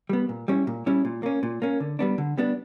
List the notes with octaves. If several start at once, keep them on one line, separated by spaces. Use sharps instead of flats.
G3 B3
A#2
G3 C#4 E4
A#2
G3 C#4 E4
A#2
A#3 C#4
A#2
A#3 C#4
D3
G3 B3 D4
D3
G3 B3 D4